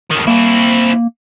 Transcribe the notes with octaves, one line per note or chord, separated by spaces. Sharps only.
F2 D#3
A#3 C4 E4